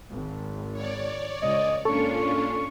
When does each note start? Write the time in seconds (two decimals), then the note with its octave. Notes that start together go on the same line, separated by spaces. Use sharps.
0.10 G#1
0.72 C#5 D5
1.42 C#2 D#5
1.85 G#2 A#3 C#4 D4 F4 A4 C#6